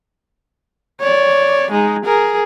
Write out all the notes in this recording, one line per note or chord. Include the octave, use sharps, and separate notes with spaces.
C#5 D5
G#3 D#4
G#4 A#4